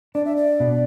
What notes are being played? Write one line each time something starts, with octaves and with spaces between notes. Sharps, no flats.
D4 D5
E5
D5
B2